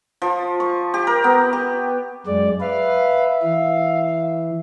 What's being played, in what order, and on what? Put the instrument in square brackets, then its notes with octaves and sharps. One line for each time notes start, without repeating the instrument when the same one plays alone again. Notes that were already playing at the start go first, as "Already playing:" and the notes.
[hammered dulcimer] F3
C#6
G4
A#4
B3
G4
[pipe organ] F#2 G#3 D5
[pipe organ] B4 [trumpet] E5 [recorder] F5
[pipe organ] E3 [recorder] F5